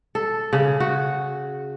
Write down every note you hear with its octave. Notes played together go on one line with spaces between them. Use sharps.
A4
C#3
F#4